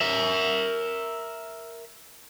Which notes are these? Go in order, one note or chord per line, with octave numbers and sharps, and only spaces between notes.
A#4 E5